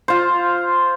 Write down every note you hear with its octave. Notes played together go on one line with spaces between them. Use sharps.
F4 C5